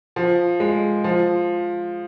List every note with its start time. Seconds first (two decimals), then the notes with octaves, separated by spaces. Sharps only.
0.16 F3
0.60 G#3
1.04 F3